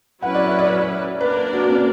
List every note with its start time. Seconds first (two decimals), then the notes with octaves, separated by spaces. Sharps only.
0.22 F#3 C#4 E4 B4 F#5
0.34 D5
0.47 E5
0.58 D5
1.21 A#3 D4 A#4 B4 D5
1.53 F#4
1.69 C#4